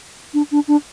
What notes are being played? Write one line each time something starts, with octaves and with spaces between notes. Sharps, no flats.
D4
D4
D4